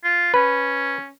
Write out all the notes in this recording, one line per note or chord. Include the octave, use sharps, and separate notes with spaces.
F4
C#4 B4